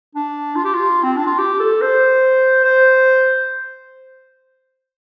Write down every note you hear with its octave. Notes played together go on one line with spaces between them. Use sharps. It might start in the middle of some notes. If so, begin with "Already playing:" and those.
D4
F4
G4
F4
C4
D4
F4
G4
A4
C5
C5